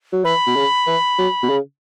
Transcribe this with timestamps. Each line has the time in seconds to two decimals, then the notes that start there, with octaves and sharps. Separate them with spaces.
0.12 F#3
0.24 E3 B5
0.46 B2
0.56 C#3
0.87 E3
1.18 F#3
1.43 B2
1.50 C#3